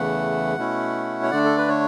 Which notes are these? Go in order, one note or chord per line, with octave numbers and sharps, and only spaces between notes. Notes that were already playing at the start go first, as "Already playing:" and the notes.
Already playing: E2 C#3 E3 A3 F#5
B2 A3 C#4 E4
C#5
D3 A3 D4 D5
A4
B4
C#5